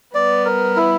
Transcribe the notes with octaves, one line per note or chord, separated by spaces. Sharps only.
G3 B3 D5
A#4
E4